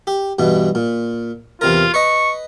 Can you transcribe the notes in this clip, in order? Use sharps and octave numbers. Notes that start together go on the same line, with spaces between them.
G4
G2 B2 E3
A#2
E2 C3 F4 A#4
B4 D#5 C#6